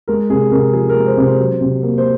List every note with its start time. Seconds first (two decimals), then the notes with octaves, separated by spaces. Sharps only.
0.08 G#3 A#4
0.30 C3 G#4
0.52 C3 A#4
0.73 F3 G#4
0.89 A#4
0.95 G#3
1.07 C5
1.17 C3
1.23 C5
1.39 F#3
1.61 C3
1.83 A#3
1.98 C5